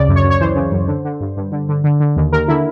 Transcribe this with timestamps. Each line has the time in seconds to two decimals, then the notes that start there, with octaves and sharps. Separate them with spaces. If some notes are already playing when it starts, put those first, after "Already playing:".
Already playing: D2 C#3 D5
0.08 F#2
0.16 C#5
0.24 F#2
0.30 C#5
0.41 E3 C5
0.56 C#3
0.72 F#2
0.88 D3
1.05 D3
1.21 G2
1.37 G2
1.52 D3
1.69 D3
1.84 D3
2.00 D3
2.16 D#2
2.33 D#2 A#4
2.48 D3 E4